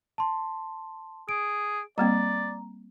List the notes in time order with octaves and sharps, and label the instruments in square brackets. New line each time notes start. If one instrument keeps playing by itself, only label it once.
[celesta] A5 C6
[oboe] G#4 [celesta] D7
[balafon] G3 A#3 C4 [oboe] D5 [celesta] A#5